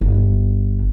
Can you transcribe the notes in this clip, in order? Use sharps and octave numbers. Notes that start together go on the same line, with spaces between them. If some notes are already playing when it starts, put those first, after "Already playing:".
G1